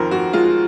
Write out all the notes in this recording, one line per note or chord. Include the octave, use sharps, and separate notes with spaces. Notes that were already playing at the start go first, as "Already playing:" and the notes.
Already playing: F2 D#3 A#4 C5
F2 F#4
G#3 F4